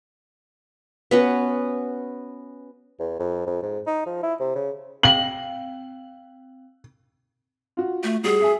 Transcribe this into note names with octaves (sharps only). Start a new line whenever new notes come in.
B3 C#4 F#4
E2
F2
F2
G#2
D#4
F3
E4
C3
C#3
C4 F5 G5 F#7
F4 F#4
A3
G3 F#4 G#4
E5 G#5